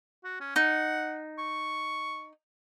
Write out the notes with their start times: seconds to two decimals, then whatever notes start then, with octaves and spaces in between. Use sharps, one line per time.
0.24 F#4
0.40 C#4
0.56 D#4 F#5
1.39 C#6